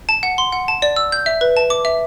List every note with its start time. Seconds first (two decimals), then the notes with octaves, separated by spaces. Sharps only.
0.09 A5
0.23 F#5
0.38 C6
0.53 F#5
0.68 A5
0.82 D5
0.96 E6
1.12 G6
1.26 E5
1.41 B4
1.57 A5
1.70 D6
1.85 E5